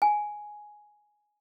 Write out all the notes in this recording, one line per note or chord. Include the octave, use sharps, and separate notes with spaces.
G#5